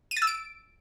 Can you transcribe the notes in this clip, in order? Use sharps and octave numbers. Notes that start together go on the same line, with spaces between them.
D#7
A6
E6
D7